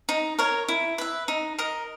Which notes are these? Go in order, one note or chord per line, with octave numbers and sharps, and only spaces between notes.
D#4
A#4 C#5
E4
B4 E5
D#4
A#4 D#5